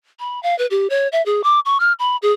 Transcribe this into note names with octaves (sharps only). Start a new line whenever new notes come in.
B5
F5
B4
G4
C#5
E5
G#4
D6
C#6
F6
B5
G#4